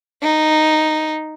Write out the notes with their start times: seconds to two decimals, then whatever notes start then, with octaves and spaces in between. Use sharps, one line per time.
0.22 D#4